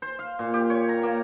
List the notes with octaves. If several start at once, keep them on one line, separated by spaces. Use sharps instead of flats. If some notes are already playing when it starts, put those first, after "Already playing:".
C5
F5
A#2
G4
C#5
A#5
A#3